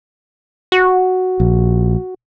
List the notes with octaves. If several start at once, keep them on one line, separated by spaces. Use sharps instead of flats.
F#4
A#1